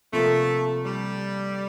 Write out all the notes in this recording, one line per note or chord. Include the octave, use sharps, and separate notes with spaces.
C3 F3 A3 A#3 F4 A4
G3